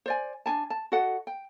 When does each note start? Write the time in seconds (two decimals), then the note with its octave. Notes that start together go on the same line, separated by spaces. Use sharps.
0.06 C5 D5 G#5
0.46 D4 G#5 A5
0.70 A5
0.92 F#4 A4 D#5 F#5
1.27 G5